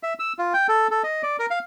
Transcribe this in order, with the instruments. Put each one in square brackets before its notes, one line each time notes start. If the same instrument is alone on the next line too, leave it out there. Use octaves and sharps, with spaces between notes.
[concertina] E5
E6
F4
G5
A4
A4
D#5
D5
A#4
F5